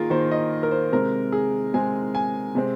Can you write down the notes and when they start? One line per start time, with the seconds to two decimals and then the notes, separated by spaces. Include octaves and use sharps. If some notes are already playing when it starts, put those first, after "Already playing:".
Already playing: D#3 A#3 F4 G#4 A#4
0.10 D#3 A#3 C5
0.31 D#5
0.63 A#4
0.71 C5
0.92 C3 G#3 C4 A#4
1.32 G#4
1.74 C3 G#3 C4 G#5
2.15 G#5
2.55 C3 G#3 C4